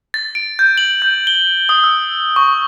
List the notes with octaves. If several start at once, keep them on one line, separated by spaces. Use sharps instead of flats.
A6
D7
G6
F#7
G6
G7
D#6
E6
C#6